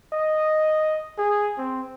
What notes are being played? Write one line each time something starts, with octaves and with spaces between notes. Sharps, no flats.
D#5
G#4
C4